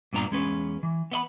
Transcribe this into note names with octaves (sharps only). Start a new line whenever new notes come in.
G2 A#2 B3 D4 A#5
E2 G#3 C#4 B4
E3
B3 D#5 B5